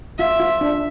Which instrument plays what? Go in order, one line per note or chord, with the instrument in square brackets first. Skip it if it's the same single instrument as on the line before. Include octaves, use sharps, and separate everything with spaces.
[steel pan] F4 [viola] E5
[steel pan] F4
D4